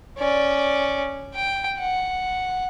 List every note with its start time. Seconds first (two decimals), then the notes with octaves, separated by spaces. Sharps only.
0.18 C#4 D5
1.35 G5
1.79 F#5